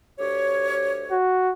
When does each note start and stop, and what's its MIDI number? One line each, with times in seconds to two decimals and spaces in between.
0.19 1.16 38
0.19 1.16 67
0.19 1.16 73
1.11 1.52 66